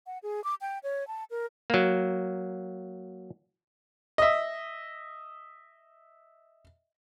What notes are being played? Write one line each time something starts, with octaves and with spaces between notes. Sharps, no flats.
F#5
G#4
D6
G5
C#5
A5
A#4
F#3 A#3
D#5 E5